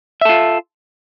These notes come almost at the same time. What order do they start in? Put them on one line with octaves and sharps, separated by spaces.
E5 A4 F4